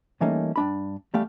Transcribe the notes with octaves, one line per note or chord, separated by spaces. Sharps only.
E3 G3 A3 A#3 C#4 D#4
G2 D4 B5
E2 G3 A3 G4 F5